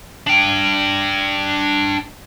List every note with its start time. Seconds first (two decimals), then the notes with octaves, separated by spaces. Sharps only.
0.27 D4 G5